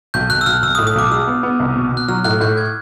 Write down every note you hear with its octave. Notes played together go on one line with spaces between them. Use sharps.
B1 G6
B1 F#6
E6
B1 F6
B1 E6
D#6
A2
D#6
B1 D6
G#3 E6
B3
B3
C2
B2
B2
F#6
F#3 F6
A2 F#6
A2 G6
G#6
G6